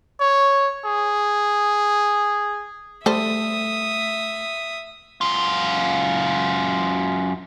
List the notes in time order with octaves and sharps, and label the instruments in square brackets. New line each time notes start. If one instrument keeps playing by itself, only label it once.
[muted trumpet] C#5
G#4
[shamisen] G3 A4 C5 [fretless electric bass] A3 [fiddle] E5 D#6
[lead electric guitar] F#2 F4